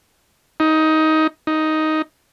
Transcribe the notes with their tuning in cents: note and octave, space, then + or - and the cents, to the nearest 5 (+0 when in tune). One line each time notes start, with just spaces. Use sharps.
D#4 +15
D#4 +5